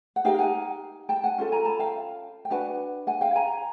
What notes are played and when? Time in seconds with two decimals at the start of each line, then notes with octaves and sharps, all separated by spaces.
0.16 F#5
0.25 D#4 G4 A#4 F5 G5
0.39 F#5 G#5
1.09 G5 A5
1.24 F#5 G#5
1.38 C#4 F4 A4
1.52 G#5 A#5
1.65 A5 B5
1.79 F5 G5
2.45 G5
2.50 D4 F#4 B4 F#5 G#5
3.07 F#5 G#5
3.21 F5 G5
3.36 G#5 A#5